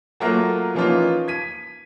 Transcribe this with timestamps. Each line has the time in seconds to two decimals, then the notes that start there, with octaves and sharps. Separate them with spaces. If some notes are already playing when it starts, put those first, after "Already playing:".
0.20 F#3 A3 A#3 F4 F#4 A#4
0.75 E3 F3 A#3 C#4 D#4 F4
1.28 G#6 B6 D#7